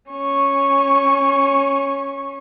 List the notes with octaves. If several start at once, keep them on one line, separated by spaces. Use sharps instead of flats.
C#4 C#6